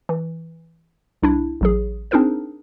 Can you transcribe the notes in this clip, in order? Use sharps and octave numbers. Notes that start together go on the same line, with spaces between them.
E3
C2 D4 E4
A1 F#3 G#4
C4 D4 D#4 G#4 A#4 C5